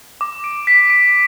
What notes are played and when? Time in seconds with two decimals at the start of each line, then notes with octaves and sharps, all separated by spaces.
0.21 D6
0.44 D7
0.67 B6
0.90 D7